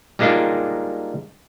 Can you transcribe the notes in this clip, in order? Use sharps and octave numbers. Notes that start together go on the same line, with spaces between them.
G3 G#3 A#3 D4 D#4 F4